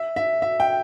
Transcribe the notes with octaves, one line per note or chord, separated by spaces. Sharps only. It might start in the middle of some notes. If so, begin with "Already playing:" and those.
Already playing: E5
E5
E5
G5